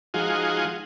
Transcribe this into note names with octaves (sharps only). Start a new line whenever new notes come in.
F3 G#3 D#4 F4 F#4 G#4